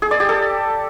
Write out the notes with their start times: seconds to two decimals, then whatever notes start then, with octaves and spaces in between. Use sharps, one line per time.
0.02 G#4
0.11 D5
0.20 G4
0.29 A4